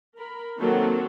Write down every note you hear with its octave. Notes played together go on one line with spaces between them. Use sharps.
A#4 B5
D#3 F#3 A#3 C4 F#4 A4